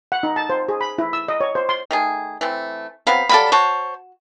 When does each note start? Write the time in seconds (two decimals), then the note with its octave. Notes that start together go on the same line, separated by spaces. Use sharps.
0.12 F#5
0.23 D#4
0.36 A5
0.50 C5
0.69 G#4
0.81 B5
0.98 E4
1.13 E6
1.28 D#5
1.41 C#5
1.55 C5
1.69 C6
1.91 D#3 A3 G#4
2.41 E3 A3 C4
3.07 F#3 B3 C4 F5 B5
3.29 F#3 G3 A4 D5 F5 B5
3.52 F#4 C5 C#5 A5